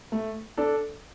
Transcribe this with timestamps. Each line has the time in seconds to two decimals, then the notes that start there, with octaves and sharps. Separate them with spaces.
0.12 A3
0.58 D4 A4